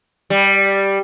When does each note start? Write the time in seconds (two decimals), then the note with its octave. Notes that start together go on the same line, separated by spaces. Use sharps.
0.30 G3